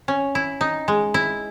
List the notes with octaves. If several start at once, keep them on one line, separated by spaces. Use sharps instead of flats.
C#4
E4
D#4
G#3
E4